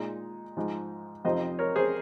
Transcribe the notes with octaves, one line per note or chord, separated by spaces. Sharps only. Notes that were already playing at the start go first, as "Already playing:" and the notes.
Already playing: A#2 G#3 D#4
G#2 F3 G#3 D#4
F2 C3 F3 C4 D#4 C5 D#5
A#4 C#5
G#4 C5